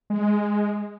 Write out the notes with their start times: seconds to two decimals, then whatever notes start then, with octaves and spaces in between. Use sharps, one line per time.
0.10 G#3